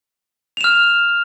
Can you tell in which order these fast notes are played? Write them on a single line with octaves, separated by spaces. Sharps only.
F7 E7 F6